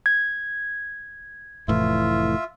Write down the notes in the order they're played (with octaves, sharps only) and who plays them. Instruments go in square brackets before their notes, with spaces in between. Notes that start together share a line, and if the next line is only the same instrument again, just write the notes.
[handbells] G#6
[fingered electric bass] F1 A2 E3 [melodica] F4 E5